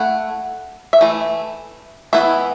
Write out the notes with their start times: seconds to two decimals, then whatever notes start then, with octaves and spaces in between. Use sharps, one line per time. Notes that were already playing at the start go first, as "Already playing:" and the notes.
Already playing: A3 E4 F#5
0.93 E5
1.01 E3 A3
2.13 E3 B3 E4 E5